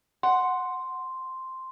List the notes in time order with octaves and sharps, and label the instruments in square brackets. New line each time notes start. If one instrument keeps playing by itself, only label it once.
[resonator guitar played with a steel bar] F#5 [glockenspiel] C6